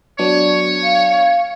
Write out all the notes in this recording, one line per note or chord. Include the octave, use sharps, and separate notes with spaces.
F#3 B3 D4 C#5
F5